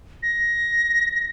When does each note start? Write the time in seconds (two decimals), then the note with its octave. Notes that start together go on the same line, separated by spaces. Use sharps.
0.23 A#6